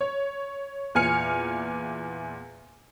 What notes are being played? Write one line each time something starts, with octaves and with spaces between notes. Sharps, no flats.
C#5
E2 A#2 G#5 F6 C#7